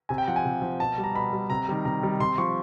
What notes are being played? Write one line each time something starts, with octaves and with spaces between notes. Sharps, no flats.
C3 G#5
G5
F3 F#5
G#5
C3
F3
B2 A5
G3
A#5
B2 B5
G3
C3 A#5
D#3 G3
C3 A#5
D#3 G3
C3 C6
F3 C#6